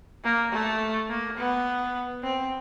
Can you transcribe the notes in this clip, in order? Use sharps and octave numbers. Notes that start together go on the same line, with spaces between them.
A#3
A3
A#3
B3
C4